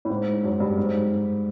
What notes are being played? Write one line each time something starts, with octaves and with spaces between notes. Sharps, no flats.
A2
G#2
F#2
G2
G#2